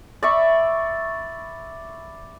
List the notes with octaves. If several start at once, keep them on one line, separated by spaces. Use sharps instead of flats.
D5 E5 B5 C#6